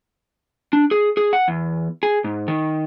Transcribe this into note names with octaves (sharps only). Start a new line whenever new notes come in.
D4
G#4
G#4
F#5
E2
G#4
G#2
D#3